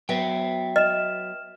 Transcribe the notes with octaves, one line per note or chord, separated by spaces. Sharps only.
F#3 B3 E5 G5
D#5 F6 E7